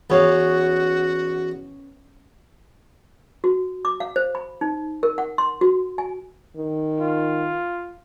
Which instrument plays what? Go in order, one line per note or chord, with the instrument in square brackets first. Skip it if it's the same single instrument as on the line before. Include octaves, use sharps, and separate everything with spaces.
[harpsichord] E2 [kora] B3 C#4 F5 [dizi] F#4
[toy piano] F#4
D6
F5
C5
B5
D#4
A#4
F#5
C6
F#4
G#5
[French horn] D#3
[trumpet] F4